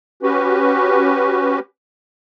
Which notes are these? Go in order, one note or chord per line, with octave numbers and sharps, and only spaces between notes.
C#4 F#4 G4 B4